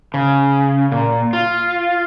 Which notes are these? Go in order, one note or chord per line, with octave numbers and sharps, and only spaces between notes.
C#3
A#2
F4